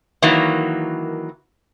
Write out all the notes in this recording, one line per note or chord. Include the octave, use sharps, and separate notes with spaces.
D#3 E3 F#3 A#3